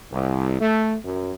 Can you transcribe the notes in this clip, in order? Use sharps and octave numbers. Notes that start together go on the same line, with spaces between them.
C2
A3
F#2